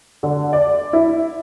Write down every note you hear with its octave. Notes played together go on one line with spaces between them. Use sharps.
D3
D5
E4